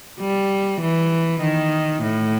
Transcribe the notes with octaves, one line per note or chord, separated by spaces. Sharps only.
G3
E3
D#3
A2